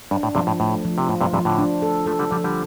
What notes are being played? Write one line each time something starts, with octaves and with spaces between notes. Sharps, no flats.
G2 D4
A2
G2 C3 F3
A2
A2 A3
F3
C3
A2 F4
G2 C3
G2 C3 F3
A2 D3
D4
A4
F3 A3 A4
D3 G3
D3 F3 G3
D3 G3